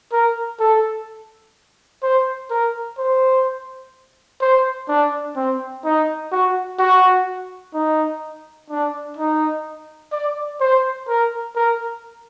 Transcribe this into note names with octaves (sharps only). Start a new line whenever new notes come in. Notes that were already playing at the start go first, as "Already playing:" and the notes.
A#4
A4
C5
A#4
C5
C5
D4
C4
D#4
F#4
F#4
D#4
D4
D#4
D5
C5
A#4
A#4